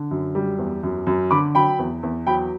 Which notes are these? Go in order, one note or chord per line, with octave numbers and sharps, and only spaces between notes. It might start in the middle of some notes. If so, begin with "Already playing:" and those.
Already playing: D3
F#2
G3
E2
F#2
F#2
D3 B5 D6
F#3 G5 B5
E2
E2
F#3 G5 B5